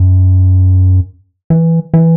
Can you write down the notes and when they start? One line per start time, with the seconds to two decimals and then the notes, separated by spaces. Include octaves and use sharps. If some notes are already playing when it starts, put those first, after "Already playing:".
Already playing: F#2
1.50 E3
1.94 E3